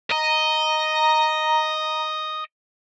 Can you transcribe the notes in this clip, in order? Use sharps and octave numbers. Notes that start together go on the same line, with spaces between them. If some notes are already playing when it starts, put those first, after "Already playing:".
D#5 A#5